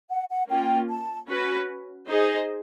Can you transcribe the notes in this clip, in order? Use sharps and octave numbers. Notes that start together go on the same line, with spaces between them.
F#5
F#5
A#3 C#4 F4 G5
A5
C#4 F#4 B4
D#4 G#4 C5 D#5